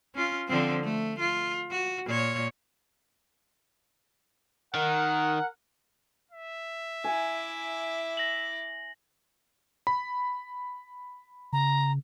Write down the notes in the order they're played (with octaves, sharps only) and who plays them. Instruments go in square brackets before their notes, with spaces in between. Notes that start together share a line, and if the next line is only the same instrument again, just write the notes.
[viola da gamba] C#4 F4
D3 F3 C4
A3
F4
F#4
A#2 C#5
[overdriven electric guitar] D#3 [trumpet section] A#4 F#5
[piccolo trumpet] E5
[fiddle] E4 D6 [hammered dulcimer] G#5
[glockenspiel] A#6 F#7
[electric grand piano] B5
[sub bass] C#3 [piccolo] A#5